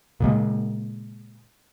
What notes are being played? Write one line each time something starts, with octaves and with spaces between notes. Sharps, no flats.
A#2 C#3 G#3